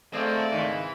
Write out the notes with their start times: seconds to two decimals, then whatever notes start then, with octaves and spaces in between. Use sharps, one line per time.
0.13 A3 C4 D#4 G#4 C5 D5 F5
0.52 G#1 C#3 E3 D#4